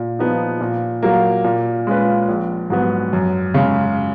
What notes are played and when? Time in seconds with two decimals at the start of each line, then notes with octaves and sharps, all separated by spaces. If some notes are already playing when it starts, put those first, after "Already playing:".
Already playing: A#2
0.19 F3 B3 D#4
0.61 A#2
1.03 F#3 A#3
1.44 A#2
1.87 G#3 C#4 F4 B4
2.28 A#1
2.70 G#2 F#3 B3
3.13 F#2
3.54 C#3 G#3